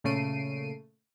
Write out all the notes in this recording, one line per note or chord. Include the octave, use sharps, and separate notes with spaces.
A#2 C#3 A3 C7 D7 D#7